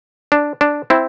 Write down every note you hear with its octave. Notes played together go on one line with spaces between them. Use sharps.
D4
D4
C4 E4